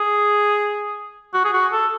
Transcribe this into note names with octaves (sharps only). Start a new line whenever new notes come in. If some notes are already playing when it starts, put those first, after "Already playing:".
Already playing: G#4
F#4
G#4
F#4
A4